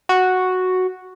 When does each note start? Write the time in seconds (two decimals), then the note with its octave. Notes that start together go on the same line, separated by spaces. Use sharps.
0.09 F#4